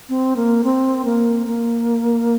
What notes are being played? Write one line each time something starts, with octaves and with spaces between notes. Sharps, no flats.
C4
A#3
C4
A#3
A#3